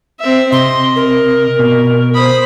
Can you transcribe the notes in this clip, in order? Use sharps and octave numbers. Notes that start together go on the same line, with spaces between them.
C4 E5
C3 D#5 C6
A#4
B2
C5 B5 D#6